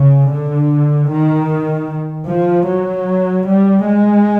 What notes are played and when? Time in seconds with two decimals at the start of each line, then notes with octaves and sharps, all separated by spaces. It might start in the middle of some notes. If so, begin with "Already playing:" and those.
Already playing: C#3
0.31 D3
1.10 D#3
2.28 F3
2.68 F#3
3.47 G3
3.87 G#3